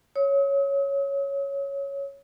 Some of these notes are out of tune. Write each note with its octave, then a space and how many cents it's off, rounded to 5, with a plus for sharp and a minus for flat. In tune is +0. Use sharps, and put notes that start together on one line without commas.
C#5 +0 D#6 +45